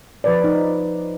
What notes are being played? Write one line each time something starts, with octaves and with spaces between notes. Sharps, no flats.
F3 B4 D5
D#4